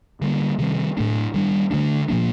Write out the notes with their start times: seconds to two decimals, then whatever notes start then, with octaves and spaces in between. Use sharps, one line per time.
0.21 D3 G3 A#3
0.58 C3 D#3 G3 C4
0.97 A2 A3 D4
1.34 D#3 G3 D4
1.71 D3 A3 D4
2.08 A#2 F3 A#3 D4